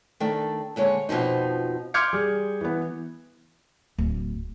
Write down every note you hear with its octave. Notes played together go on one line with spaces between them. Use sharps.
D#3 A3 D4
D#2 D3 G#3 C#5
F2 B2 E3 F3 D#4
C6 D6 F6 G6 G#6 C#7
G3 G#4
E3 B3
D1